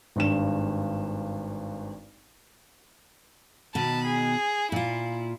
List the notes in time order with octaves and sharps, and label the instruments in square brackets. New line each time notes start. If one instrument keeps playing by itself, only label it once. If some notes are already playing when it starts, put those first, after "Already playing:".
[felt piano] G#1 G2 E7
[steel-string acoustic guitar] B2 D#3 [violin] A5 B5
[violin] G#4
[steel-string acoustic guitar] A#2 F4 [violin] E4